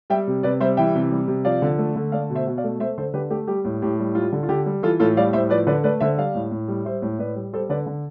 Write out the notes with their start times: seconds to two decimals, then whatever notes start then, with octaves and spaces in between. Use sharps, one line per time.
0.10 G3 E5 G5
0.27 C3
0.43 C3 B4 D5
0.60 G3 C5 E5
0.77 E3 E5 G5
0.95 C3
1.11 G3
1.28 C3
1.45 F3 D5 F5
1.62 D3
1.78 A3
1.96 D3
2.12 A3 D5 F5
2.30 B2
2.35 C5 E5
2.47 B2
2.58 D5 F5
2.64 A3
2.80 A3 C5 E5
2.98 D3 A4 C5
3.14 D3 G4 B4
3.30 A3 G4
3.48 G3 G4
3.65 A2
3.82 A2 G4
3.99 G3
4.15 G3 F4
4.32 D3
4.43 F4
4.49 D3 G4
4.66 G3
4.83 E3 F4 A4
5.00 A2 F4 A4
5.17 G3 D5 F5
5.33 A2 C5 E5
5.50 F3 B4 D5
5.67 D3 B4 D5
5.84 A3 B4 D5
6.00 D3 C5 E5
6.17 G3 D5 F5
6.35 A2
6.51 A2
6.68 G3
6.85 G3 C5 E5
7.02 A2
7.19 A2 B4 D5
7.36 G3
7.53 G3 A4 C5
7.70 D3 B4 D5
7.86 D3